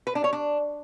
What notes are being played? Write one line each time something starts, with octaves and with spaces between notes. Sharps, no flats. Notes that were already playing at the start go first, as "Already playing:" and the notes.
B4
D4
C#5
D4